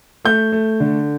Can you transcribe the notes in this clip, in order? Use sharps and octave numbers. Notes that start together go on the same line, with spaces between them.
A3 G6
A3
D3